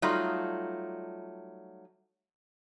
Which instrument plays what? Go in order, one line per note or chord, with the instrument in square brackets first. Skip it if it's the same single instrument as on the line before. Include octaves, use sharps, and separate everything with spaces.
[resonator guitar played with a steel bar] F#3 G3 A3 D#4 F4